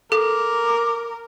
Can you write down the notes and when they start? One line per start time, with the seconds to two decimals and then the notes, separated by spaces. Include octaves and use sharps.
0.12 A4 A#4 D6